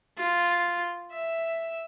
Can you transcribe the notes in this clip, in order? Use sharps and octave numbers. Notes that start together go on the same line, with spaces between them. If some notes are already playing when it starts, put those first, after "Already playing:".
F4
E5